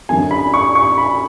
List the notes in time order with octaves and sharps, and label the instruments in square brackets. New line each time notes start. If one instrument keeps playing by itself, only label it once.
[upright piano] F#2 D3 F#3 G#5
B5
C#6
C#6
B5